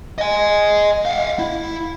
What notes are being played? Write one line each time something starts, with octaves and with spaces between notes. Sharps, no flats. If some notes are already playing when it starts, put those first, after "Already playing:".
D#5 G#5
F5 F#5
E4